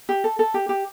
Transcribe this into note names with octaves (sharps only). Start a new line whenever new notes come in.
G4
A4
A4
G4
G4